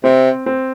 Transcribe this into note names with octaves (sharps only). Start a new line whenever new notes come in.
C3 C4
C4